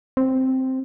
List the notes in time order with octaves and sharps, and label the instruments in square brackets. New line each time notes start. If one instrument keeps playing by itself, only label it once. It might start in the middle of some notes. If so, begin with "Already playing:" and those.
[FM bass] C4